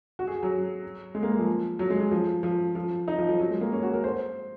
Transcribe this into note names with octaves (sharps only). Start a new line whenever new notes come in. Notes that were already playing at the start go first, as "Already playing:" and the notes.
F#4
G#4
F#3
G#3
A#3
G#3
F3
F#3
G#3
F#3
F3
F3
F3
D#4
F3
F3
F#3
G#3
A#3
C#4
F#4
A#4
C5